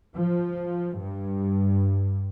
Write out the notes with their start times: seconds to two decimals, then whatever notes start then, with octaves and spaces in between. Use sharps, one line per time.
0.14 F3
0.98 G2